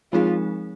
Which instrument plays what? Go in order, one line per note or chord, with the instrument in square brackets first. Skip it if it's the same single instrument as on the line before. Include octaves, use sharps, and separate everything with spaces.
[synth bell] F3 G#3 C4 D#4 G#4 [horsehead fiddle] F4